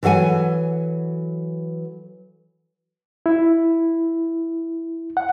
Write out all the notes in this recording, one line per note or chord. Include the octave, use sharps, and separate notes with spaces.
E3 F#3 A4 F5 G#5
E4
F#5